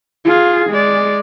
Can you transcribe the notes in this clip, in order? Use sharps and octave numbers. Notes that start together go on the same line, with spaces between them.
F4 G#4
G#3 D5